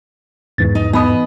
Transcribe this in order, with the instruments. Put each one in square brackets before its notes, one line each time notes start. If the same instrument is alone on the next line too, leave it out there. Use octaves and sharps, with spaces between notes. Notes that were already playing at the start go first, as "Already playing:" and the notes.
[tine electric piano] E2 G#2 E3 [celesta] A6
[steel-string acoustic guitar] D#4
[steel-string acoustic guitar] B3 D#5 [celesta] D#4 B5 D#6